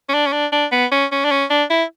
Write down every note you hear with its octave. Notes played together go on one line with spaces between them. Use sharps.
C#4
D4
C#4
D4
D4
B3
C#4
C#4
D4
C#4
D4
E4